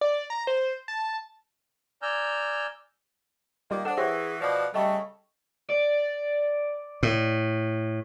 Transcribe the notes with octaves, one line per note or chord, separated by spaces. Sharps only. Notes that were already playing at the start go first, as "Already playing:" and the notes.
D5
A#5
C5
A5
D5 G#5 A#5 E6 F6 G6
D#3 G3 A#3 F4 D5
D4 A4 C5 F#5 D#6 E7
E3 G4 G#4 C5 C#5 F#5 C#6 A#6
B2 F3 D5
C#3 G3 A3 D#5 G5 C#6
D5
A2